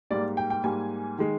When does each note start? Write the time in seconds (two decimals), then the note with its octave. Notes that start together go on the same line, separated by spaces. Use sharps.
0.10 G#2 G3 A#3 D5
0.37 G5
0.50 G5
0.64 G#2 G3 A#3 G#5
1.19 D#3 G#3